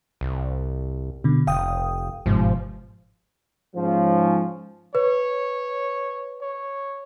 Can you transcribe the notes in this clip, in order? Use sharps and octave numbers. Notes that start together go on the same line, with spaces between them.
C2
B2 D3
F1 F5 G5 D#6
G1 G#2 B2 F3
G#2 F3 C#4
B4 C#5
C#5